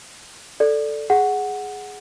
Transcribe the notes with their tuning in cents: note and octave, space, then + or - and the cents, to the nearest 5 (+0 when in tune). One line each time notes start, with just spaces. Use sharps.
A4 +0 D5 +0
G#4 +0 F#5 +0